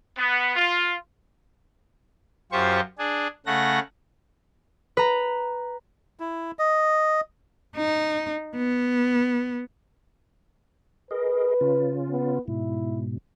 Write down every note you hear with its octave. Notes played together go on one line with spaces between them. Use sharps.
B3
F4
F#2 F4 G4 C5 C#6
D4 G#4
C#3 A3 F#5 A#6
B4 A#5
E4
D#5
D#4
B3
G#4 A#4 B4 D#5
C#3 C#4 F4
B3
G#2 B2 E4